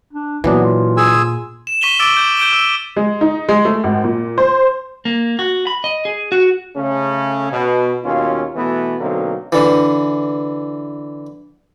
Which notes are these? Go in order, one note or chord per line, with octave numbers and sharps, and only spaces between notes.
D4
A#2 E3 F#3 B3 D4
F4
G#4 G#5 E6
E7
C#6 B6 D#7 F7 G7
C#6 D6 E6 A6 D7 F#7
G6
G6 D7 G7
E6
G#3
D#4
G#3
A3
G#1
A#2
C5
A#3
F#4
B5
D#5
G#4
F#4
C#3 A3 C#4
B2
D#2 B2 C#4 F4
B2 E3 A3 B3
B2 D3 F#3 A#3 C4 D#4
D3 E3